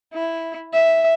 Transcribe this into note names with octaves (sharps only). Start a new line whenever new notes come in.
E4
E5